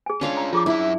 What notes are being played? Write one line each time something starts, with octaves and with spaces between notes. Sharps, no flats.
G#4 G#5
C#4 D4 F4 C#5 F5
A#5
F3 F4 G#4 D6
F#2 E4 E5